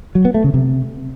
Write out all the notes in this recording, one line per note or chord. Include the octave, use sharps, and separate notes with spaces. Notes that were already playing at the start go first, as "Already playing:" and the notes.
F#3
B3
A3
C#3
C3